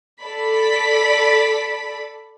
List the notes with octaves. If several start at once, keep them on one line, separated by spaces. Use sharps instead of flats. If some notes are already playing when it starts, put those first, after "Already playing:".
A4 D5 B5 B6